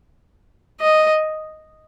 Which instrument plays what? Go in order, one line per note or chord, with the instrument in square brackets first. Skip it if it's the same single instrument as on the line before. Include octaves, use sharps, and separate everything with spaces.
[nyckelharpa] D#5